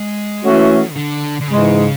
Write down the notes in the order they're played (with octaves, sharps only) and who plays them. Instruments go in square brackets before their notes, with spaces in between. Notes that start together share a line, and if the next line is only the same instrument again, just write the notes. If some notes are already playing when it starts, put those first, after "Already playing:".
Already playing: [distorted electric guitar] G#3
[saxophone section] E3 A3 C#4 F#4
[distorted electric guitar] C#3
D3
D3
[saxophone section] G#2 E3 G#3 [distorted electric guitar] C#3